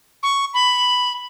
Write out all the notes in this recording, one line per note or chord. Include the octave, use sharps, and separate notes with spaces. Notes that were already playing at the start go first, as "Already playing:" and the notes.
C#6
B5